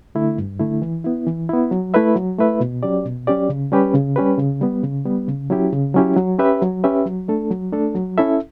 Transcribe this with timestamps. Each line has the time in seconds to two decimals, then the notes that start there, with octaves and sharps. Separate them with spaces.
0.15 D3 A3 E4
0.38 G2
0.60 D3 A3 E4
0.82 E3
1.04 B3 E4
1.27 E3
1.49 B3 E4
1.71 F#3
1.94 A3 E4 B4 E5
2.16 F#3
2.38 A3 E4 B4 E5
2.60 B2
2.83 F#3 C#4 G4 D5
3.05 B2
3.27 F#3 C#4 G4 D5
3.49 C#3
3.72 G3 C#4 G4 B4
3.94 C#3
4.16 G3 C#4 G4 B4
4.38 C#3
4.61 G3 B3
4.83 C#3
5.05 G3 B3
5.28 C#3
5.50 F#3 C#4 E4 G4
5.73 C#3
5.95 F#3 C#4 E4 G4
6.16 F#3
6.39 C#4 G4 B4 E5
6.62 F#3
6.84 C#4 G4 B4 E5
7.06 F#3
7.28 A3 D4 A4
7.50 F#3
7.72 A3 D4 A4
7.95 F#3
8.18 C#4 E4 A4 E5